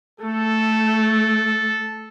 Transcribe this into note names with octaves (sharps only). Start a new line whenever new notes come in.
A3 A4